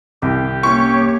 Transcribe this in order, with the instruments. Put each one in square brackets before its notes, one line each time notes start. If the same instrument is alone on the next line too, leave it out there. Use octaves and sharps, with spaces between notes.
[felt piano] C2 [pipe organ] G4
[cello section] A#3 C#4 C#5 [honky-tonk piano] C#6